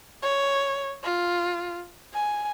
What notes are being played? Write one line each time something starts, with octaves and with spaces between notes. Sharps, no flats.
C#5
F4
G#5